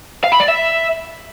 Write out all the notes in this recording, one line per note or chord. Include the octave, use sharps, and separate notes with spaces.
F5
B5
D5
E5